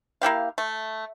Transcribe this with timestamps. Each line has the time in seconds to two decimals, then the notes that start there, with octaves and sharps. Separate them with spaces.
0.21 A#3 E4 G4 F5
0.58 A3